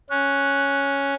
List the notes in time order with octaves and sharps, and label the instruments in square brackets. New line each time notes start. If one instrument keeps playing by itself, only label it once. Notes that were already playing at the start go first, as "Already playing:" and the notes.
[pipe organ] C#4 [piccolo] F#6